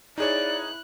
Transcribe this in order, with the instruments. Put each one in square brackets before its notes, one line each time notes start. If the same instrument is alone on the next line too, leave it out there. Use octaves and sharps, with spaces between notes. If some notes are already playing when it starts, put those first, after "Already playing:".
[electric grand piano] D#4 G#4 C#5 [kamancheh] E4 F#6 [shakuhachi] D5